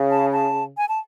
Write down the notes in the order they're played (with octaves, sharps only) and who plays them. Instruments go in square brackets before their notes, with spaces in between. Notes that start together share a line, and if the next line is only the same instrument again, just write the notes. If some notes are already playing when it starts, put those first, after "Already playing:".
Already playing: [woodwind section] C#3
[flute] A5
A5
G#5
A5